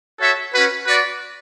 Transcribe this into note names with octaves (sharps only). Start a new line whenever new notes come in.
F#4 A4 C#5 E5
C#4 F#4 B4
F#4 B4 D5